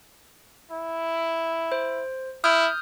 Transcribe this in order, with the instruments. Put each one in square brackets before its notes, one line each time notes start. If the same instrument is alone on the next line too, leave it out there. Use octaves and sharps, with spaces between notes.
[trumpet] E4
[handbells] C5
[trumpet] E4 [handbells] D#6 F6 G6